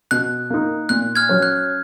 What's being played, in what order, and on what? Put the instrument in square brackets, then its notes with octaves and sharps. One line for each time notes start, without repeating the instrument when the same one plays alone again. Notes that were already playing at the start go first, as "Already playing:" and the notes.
[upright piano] B2 [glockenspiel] F#6
[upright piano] A#3 D#4
[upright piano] A#2 [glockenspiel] F#6
[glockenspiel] F6 G#6
[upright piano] F#3 C#4
[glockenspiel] F#6